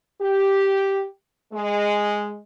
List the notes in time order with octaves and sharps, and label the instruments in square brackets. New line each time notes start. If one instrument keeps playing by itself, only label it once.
[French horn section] G4
G#3